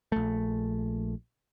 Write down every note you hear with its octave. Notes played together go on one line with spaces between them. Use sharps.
A#1 A3